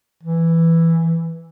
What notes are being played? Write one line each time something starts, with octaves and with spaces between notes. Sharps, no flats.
E3